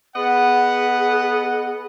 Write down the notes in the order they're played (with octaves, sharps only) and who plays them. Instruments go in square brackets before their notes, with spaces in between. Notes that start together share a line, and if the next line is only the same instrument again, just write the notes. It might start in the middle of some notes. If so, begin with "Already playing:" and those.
[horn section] B3 D#5 F#5 [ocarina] G#4